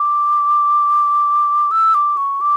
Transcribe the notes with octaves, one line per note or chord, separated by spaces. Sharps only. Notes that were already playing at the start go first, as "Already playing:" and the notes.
Already playing: D6
E6
D6
C#6
D6